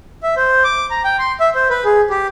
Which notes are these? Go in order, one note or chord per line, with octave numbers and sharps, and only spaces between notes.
E5
C5
D6
A#5
G5
C6
E5
C5
B4
G#4
G4